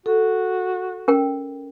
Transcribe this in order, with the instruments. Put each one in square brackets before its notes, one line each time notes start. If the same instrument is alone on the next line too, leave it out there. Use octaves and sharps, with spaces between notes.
[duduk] F#4 [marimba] A4
[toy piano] C#4 A#4 G5